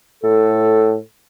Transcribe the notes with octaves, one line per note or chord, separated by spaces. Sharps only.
A2 A4